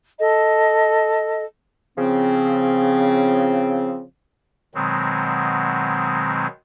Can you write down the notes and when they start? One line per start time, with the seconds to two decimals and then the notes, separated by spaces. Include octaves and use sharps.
0.19 A4 D#5
1.97 C#3 F3 C4
4.75 B2 D#3 F#3 G#3 C4